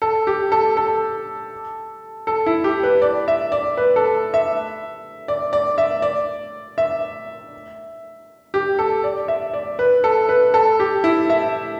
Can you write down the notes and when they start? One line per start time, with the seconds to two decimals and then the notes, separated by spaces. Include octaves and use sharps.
0.02 A4
0.27 G4
0.52 A4
0.77 A4
2.27 A4
2.46 E4
2.64 G4
2.83 B4
3.02 D5
3.28 E5
3.52 D5
3.77 B4
3.96 A4
4.34 E5
5.28 D5
5.53 D5
5.78 E5
6.02 D5
6.78 E5
8.54 G4
8.79 A4
9.04 D5
9.28 E5
9.54 D5
9.79 B4
10.04 A4
10.29 B4
10.54 A4
10.80 G4
11.04 E4
11.30 E5